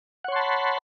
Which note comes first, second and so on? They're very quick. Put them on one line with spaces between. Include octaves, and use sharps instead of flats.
F#5 C#5 C6 A5 B5